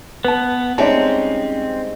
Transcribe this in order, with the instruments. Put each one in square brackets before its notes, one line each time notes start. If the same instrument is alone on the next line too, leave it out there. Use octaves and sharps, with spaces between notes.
[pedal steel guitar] B3 [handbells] B4 A5
[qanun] G3 G#3 D#4 [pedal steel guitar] C4 [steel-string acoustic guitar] C#4 [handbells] D5 E5 A5